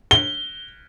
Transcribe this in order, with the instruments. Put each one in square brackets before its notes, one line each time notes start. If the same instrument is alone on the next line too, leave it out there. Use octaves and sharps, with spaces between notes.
[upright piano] G7